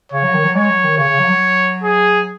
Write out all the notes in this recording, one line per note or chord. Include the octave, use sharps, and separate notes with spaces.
C#3 C#5
F#3
D#3
F#3
G#3 C#5
F#3
D#3
C#3 C#5
C#3
F#3
F#3
G#4